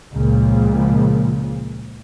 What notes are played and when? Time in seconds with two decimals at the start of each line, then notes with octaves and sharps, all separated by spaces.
0.11 C#2 A#2 F3